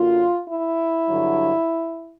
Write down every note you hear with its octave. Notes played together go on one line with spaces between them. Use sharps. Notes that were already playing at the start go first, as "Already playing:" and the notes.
Already playing: F#2 D3 F#3 A#3 F4
E4
G2 D3 F#3